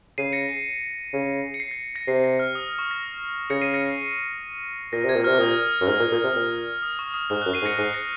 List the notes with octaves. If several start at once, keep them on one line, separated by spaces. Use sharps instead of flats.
C#3 C7 D#7
A#6 C#7
C7
C#3
C#7
C7
A#6
A#6 C#7
C3 C7
C7
A#6
F6
D#6
C#6
A#6
C#3 A#6 C#7
C7 D#7
A#6 C#7
C7
C7
A#2 A#6
C3 G#6
A#2
C3 F6
A#2 D#6
F#2
G#2 F6
A#2
A#2
C3
A#2
D#6
C#6
D#6
G#2 F6
F#2 F#6
C7 D#7
G#2
A#6 C#7
G#2 C7 D#7
A#6 C#7